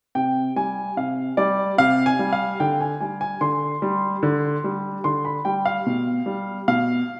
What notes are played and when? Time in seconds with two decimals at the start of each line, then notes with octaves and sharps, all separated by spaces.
0.15 C3 G5
0.56 G3 G#5
0.97 C3 F5
1.37 G3 D5
1.78 C3 F5
2.06 G#5
2.19 G3
2.33 F5
2.60 D3 G5
2.81 G#5
3.00 G3 G#5
3.21 G#5
3.41 D3 C6
3.82 G3
4.23 D3
4.64 G3
5.04 D3 C6
5.25 B5
5.45 G3 G5
5.65 F5
5.86 B2
6.26 G3
6.68 B2 F5